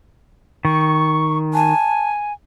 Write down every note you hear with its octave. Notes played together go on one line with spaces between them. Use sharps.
D#3 C#6
G#5 A5